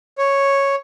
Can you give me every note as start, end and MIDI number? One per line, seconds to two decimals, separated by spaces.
0.18 0.75 73